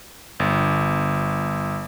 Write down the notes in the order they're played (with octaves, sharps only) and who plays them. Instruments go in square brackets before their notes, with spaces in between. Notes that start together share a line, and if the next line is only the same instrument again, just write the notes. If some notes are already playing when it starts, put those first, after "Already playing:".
[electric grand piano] G1